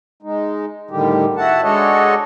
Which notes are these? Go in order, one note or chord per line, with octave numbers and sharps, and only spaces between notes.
G#3 D#4
A2 D3 D#3 G3 G4
E4 F#4 F#5 A5
G#3 D4 F#4 A4 C#5 D#5